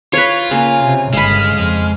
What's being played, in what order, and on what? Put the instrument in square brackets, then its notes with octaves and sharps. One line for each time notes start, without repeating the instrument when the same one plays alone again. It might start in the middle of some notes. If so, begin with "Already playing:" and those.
[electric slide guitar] F4 [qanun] B4 C#5
[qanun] C#3 [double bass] A#3 [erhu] G#5
[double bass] C3
[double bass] G1 [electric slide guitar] G#3 [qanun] F5 B5 [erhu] F6
[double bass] F2